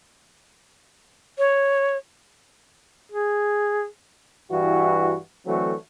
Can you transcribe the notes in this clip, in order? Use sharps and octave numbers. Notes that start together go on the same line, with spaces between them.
C#5
G#4
G2 E3 E4 F#4
D3 E3 F#3 A3 C4 F#4